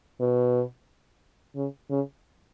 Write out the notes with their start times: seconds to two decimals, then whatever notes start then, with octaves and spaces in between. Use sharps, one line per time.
0.21 B2
1.56 C#3
1.90 C#3